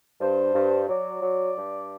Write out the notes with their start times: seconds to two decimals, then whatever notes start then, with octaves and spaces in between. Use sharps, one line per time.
0.21 G2 C5
0.54 G2
0.88 F#3 D5
1.22 F#3
1.56 G2